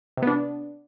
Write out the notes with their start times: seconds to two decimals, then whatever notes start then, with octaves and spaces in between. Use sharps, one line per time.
0.17 C3
0.22 B3
0.27 D4